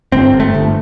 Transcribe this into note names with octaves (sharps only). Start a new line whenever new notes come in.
G1 C4
G1
A3
G1